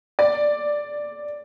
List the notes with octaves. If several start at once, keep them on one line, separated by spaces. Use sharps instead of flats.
D5